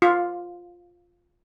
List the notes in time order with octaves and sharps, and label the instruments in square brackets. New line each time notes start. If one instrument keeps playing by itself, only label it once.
[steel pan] F4